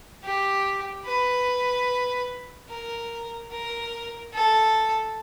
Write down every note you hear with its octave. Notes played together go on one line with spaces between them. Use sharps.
G4
B4
A#4
A#4
A4